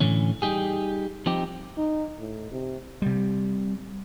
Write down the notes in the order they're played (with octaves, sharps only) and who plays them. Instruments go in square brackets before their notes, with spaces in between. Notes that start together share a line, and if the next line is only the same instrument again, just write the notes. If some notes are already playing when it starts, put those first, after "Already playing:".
[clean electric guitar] A2 D3 E3 C#4
G3 D#4 G4 G#4
F3 C4 D#4 G4
[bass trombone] D#4
A2
C3
[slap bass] C3 G3